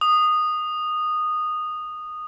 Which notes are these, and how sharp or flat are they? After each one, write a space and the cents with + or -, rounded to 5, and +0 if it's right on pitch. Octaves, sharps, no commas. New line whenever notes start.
D#6 -15